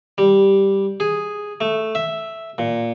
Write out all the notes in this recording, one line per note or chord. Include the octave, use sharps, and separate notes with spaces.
G3
G#4
A3
E5
A#2